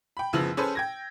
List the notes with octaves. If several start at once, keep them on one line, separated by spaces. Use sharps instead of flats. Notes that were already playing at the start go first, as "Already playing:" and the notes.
G5 B5
F#1 C#3 F3 B3 E6 F#7
C#4 G#4 A4 B4 C5
G5 G#6 A#6